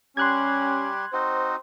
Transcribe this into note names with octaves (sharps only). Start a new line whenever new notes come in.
G3 C#4 G4 C6 F#6 G#6
C4 D#4 F#4 C5